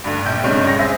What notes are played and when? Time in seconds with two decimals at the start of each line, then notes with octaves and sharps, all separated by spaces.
0.04 D2 G2
0.25 A#1 G5 G6
0.44 G2 C3 G#3 C#4
0.64 C#2 A#6
0.79 G#4 C5 E5